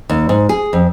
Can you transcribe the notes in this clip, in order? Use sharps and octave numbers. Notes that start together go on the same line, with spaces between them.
D#2
G#2
G#4
F2